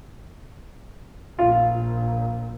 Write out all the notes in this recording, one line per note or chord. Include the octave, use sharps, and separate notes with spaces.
A#1 F4